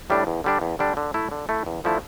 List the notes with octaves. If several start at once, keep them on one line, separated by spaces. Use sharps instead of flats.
A2 G3 D4
E2
D3 G3 D4
E2
D3 G3 D4
D3
A3 E4
D3
A3 E4
E2
D3 F3 A3 E4